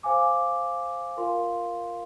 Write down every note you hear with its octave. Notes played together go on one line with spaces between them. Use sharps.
C5 F5 G#5 D6
F4 A#4 F5 C6